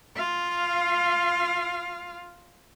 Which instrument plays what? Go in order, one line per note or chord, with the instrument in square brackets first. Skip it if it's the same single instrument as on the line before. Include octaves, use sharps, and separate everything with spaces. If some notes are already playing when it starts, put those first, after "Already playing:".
[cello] F4 F5